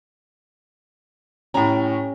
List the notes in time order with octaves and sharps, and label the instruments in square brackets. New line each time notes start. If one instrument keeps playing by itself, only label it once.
[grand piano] A2 A#5 [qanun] C#4 G4